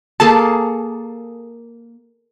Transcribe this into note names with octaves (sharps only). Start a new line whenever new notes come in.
A#3 G#4 A4 A5